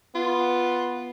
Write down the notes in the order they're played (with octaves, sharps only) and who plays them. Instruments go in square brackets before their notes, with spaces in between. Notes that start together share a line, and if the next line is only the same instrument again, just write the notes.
[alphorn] B3 [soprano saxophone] F4